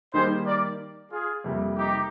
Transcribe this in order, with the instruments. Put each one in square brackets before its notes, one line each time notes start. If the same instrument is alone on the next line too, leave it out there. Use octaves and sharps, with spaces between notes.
[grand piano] D#3 G3 A#3 D#4 G4 [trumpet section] G#4 C5
[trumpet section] A#4 D5
F4 G#4
[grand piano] F2 C3 G3 A#3
[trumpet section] D#4 G4